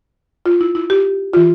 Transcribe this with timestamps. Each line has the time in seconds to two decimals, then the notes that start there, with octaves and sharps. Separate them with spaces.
0.46 F4
0.61 E4
0.75 E4
0.90 G4
1.33 E3 F4